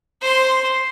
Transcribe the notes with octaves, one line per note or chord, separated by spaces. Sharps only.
C5 C6